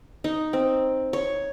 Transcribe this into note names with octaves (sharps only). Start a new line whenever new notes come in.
D#4
C4
C#5